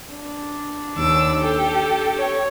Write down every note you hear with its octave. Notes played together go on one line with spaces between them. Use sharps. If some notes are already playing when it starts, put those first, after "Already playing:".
D4
D#2 D6 E6
G4 A4
C#5